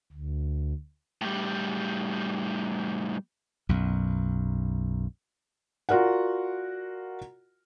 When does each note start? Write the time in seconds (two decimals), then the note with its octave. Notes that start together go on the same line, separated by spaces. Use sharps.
0.12 D2
1.21 A2 G3
3.69 B1 F#2
5.89 F4 F#4 A#4 D5 F#5